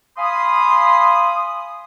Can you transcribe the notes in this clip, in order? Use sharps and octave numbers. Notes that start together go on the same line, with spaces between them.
F5 G#5 B5 C6 D#6